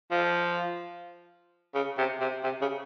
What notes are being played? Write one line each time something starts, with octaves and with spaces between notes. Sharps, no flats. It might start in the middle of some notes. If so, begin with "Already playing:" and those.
F3
C#3
C3
C3
C3
C#3